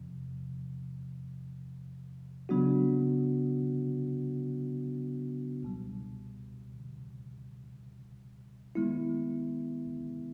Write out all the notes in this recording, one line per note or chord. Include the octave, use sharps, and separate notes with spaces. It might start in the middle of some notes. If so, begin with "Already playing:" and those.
Already playing: E2 C3 F3
C#3 F#3 B3 D4 F#4
C#2 B2 G3
D#3 G#3 B3 E4